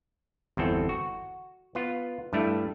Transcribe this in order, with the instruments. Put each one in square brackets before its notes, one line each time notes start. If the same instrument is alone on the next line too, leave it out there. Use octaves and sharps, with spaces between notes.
[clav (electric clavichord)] G1 E2 C4 A4
F#4
B3 F4
G2 G3 A3 E4